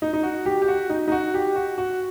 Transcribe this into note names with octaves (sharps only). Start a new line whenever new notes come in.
D#4
D#4
F#4
G4
G4
F#4
D#4
D#4
F#4
G4
F#4
F#4